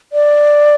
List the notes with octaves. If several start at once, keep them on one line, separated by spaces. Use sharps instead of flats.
D5